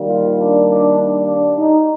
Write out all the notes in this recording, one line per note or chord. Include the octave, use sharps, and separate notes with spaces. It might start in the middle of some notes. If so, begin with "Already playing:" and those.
Already playing: D#3 G3 A#3
F4
D4
D4
D4
D4
D#4